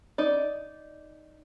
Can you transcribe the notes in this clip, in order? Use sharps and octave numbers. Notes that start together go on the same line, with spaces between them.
D#4 D5